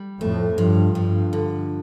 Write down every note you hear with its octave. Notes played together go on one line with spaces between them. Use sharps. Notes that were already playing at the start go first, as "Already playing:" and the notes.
Already playing: G3
F2 A2 A3
G2 F3
G2 F3
D3